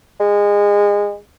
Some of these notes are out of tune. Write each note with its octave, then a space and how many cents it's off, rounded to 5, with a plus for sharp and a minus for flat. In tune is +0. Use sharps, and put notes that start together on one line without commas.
G#3 -25